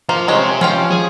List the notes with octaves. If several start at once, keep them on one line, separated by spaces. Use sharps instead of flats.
A#3 F4 C5
G#3 G4 C5 C#5
F3 C#4 F4 G5
G#4